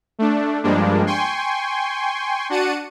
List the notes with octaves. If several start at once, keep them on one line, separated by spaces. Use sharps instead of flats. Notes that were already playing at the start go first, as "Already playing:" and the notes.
A3 D4
G2 F3 G3 G#3 A#3 D4
G5 G#5 C6 C#6
D4 F#4 F#5 A5 C#7 D#7